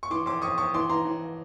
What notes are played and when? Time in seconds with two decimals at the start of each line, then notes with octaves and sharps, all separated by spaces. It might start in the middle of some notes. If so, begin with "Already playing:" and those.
0.03 C#6
0.10 E3 C6 D6
0.26 F2 C6 D6
0.42 F2 C#6 D#6
0.58 F2 C#6 D#6
0.74 E3 C6 D6
0.90 E3 A#5 C6
1.05 E3